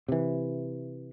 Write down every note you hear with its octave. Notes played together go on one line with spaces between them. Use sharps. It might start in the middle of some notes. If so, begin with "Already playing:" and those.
C3 E3